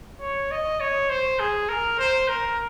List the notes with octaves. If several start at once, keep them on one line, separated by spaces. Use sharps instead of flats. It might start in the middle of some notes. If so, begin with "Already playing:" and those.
C#5
D#5
C#5
C5
G#4
A#4
C5
A#4